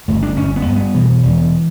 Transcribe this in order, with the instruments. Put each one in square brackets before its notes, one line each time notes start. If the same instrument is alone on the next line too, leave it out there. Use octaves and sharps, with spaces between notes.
[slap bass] G1 A3
D4
G1 C#4
B3
G2
B3
B2 E3
E1